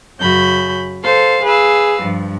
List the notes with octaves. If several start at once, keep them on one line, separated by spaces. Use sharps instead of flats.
F#2 C#3 F#4 B5 G6
A4 C5 F5
G#4 B4 F5 E6
G2 F3